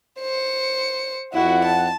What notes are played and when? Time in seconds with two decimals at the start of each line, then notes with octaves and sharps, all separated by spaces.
0.19 C5 C#7
1.33 F2 E4 F#4 F#5
1.64 A5